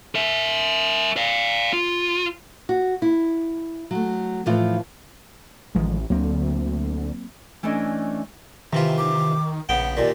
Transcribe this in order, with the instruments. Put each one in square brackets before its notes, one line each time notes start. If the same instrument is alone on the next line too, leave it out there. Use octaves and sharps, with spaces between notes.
[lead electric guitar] A#4 E5
D5 F5
F4
[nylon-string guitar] F#4
E4
F#3 A3
A2 E3 F3 F4
[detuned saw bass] A1 [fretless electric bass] D#3 F3 G#3
[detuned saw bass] D2 [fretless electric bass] F#3 A#3 C4
[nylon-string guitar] E3 A3 C#4 D4 D#5
[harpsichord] C3 E3 F4 [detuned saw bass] D#3
[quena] D6
[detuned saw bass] A#1 [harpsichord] C#3 B3 G5 [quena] F#5
[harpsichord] D#2 A#2 [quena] D5